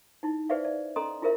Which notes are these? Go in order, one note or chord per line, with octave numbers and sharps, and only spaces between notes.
D#4 E4
G#4 B4 C5 D5 E5 F5
D5
C#4 A4 D#5 A#5 C6 D#6
E4 F4 G#4 A#4 C5 E5